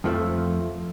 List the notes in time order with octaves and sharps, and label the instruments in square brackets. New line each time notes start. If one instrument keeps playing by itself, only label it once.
[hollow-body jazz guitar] F2 F3 A3